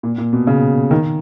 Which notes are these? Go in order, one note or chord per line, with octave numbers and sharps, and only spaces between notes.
A#2
A#2
B2
C#3
D#3